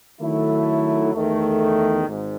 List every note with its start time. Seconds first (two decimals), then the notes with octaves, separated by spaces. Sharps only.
0.21 D#3 F#3 A3 E4
1.14 E2 D#3 A3
2.07 G#1 G#2